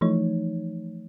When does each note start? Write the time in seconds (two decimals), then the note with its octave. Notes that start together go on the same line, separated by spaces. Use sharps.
0.01 E3 F3 A3 D#4 C#5